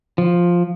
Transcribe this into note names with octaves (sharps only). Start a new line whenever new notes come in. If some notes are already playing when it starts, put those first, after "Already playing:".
F3